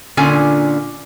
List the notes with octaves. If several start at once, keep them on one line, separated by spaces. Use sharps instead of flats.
A#2 D3 C#4 F4 G#5